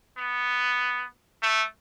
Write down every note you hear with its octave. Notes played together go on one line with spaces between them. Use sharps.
B3
A3